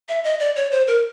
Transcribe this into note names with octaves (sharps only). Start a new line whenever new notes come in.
E5
D#5
D5
C#5
C5
A#4